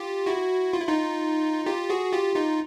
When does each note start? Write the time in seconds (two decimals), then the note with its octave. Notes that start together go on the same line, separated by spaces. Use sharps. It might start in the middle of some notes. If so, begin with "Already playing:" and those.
Already playing: F4 G4
0.26 E4 F#4
0.73 F4
0.82 E4
0.88 D#4 F4
1.66 F4 G4
1.90 F#4 G#4
2.12 F4 G4
2.36 D#4 F4